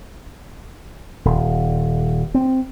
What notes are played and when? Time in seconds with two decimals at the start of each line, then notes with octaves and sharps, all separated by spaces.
1.25 D#1
2.34 C4